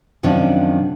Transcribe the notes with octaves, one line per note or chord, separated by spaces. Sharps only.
F#2 C3 D#3 F3 C#4 D4